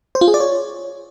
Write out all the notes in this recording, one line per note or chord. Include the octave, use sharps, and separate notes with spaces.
C5
F4
G#4
D5
C#5